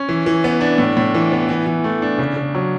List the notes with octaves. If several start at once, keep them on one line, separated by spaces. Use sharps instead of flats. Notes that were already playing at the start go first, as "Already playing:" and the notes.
Already playing: C#4
E3
E3
B3
D4
A2
A2
E3
B3
E3
E3
A3
D4
C#3
C#3
F#3